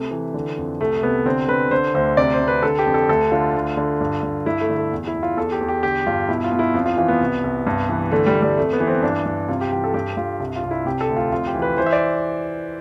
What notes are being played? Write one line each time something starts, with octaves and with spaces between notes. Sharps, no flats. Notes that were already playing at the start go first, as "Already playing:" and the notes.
Already playing: C3 A3
E3
D3
F2
C2 A3
C3 B3
D3 C4
D3 B4
D3 C5
D2 C5
C3 D5
C5
C3
B4
D3 A4
G4
F2
A4
D2 A4
D3 F4
D2
D3
G2
G2
G2 E4
A3
D3
A3
E2
E4
E2
F4
E2 A4
G4
E2
G4
D3 G4
G2 F4
B2 E4
F4
B2
E4
F2 F4
F4
E3 F4
B3
C2
C2
G2
E3
D3 A3
G3
D3
G3
F2 A3
B3
E3
C4
G2 D4
G2
C3 F4
G4
E3 G4
A4
G2 G4
G2 F4
C2
F4
C2
E4
C3 G4
A4
D2
F4
F2 F4
G4
E3
B4
E3 C5
E5
D5